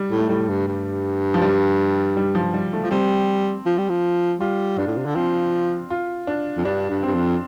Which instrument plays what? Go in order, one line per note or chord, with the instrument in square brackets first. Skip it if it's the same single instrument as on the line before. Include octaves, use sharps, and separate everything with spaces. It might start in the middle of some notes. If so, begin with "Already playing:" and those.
Already playing: [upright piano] G3
[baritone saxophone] A2
[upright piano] A3
[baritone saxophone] A2 [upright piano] G3
[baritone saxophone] G2
G2
[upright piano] F3
G3
G3
F3
G3
A3
[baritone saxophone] F3
[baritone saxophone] G3 [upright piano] C4
[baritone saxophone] F3
G3
F3
[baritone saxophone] G3 [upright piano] F4
[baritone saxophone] G2 [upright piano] D4
[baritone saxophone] A2
C3
D3
[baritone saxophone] F3 [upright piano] C4
[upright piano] F4
D4
[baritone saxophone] F2
[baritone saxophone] G2 [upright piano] D4
[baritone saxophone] G2
[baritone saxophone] G2 [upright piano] C4
[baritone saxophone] F2